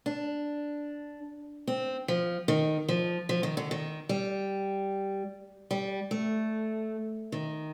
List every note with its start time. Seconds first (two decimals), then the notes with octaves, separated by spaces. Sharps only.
0.06 D4
1.67 C4
2.08 F3
2.48 D#3
2.89 F3
3.29 F3
3.43 D#3
3.57 D3
3.71 D#3
4.09 G3
5.71 G3
6.11 A3
7.32 D#3